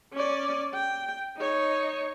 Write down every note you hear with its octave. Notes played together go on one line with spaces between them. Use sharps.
C#4 D5
G5
D#4 C#5